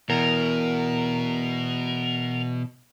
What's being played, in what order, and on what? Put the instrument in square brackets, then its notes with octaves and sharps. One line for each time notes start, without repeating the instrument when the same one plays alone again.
[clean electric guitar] E2 [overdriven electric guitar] B2 [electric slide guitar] A#4